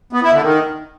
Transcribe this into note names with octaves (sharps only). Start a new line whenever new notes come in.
B3
E4
D3
D#3